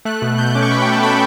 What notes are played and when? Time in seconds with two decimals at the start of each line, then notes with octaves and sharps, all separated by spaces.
0.05 A3 F#6
0.22 B2
0.38 B2 G6
0.46 F#6
0.55 C#4 D6
0.63 C#6
0.71 B2 B5
0.82 G5
0.87 A3
0.93 A5
1.03 A3 B5